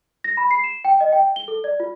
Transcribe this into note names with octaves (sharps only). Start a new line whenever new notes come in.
A#6
B5
C7
E7
G5
D#5
G5
G7
A4
D5
F4